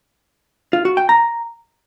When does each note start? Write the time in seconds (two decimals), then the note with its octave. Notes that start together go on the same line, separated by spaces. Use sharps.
0.73 F4
0.85 F#4
0.97 G5
1.09 A#5